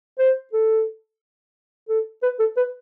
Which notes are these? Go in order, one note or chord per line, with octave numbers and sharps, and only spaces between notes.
C5
A4
A4
B4
A4
B4